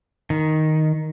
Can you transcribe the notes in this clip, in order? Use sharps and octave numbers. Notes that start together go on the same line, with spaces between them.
D#3